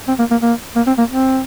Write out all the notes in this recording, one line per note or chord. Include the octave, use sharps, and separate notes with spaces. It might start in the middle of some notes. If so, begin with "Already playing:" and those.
C4
A#3
A#3
A#3
A#3
C4
A#3
C4